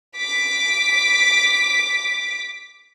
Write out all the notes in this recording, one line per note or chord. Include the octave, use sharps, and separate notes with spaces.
D6 B6